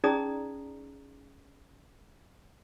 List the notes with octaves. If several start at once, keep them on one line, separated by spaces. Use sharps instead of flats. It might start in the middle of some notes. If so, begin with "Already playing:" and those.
C#4 D#4 G#4 D5 A#5 D#6